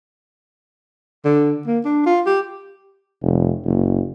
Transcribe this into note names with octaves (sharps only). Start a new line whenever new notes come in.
D3
A#3
D4
F4
G4
F1
F#1